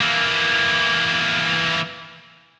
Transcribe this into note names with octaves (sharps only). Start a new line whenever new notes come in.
E3 A#3